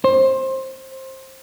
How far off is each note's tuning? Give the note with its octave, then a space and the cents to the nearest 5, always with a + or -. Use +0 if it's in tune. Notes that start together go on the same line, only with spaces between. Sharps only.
C5 +20